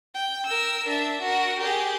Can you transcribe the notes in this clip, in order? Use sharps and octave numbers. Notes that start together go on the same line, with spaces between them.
G5
A#4 E6
D4 E5
F#4 A#4
G4 G#4